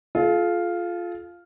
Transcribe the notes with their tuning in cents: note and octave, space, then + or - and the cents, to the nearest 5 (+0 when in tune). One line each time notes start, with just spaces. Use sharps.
F4 +0 A4 -45